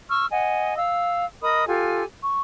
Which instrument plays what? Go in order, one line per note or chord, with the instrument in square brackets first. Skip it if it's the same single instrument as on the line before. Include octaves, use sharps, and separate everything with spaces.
[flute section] C#6 E6 F6
D#5 F#5 G#5
F5 E6
A#4 D#5 B5 D#6
F4 G4 A4 G#5
C#6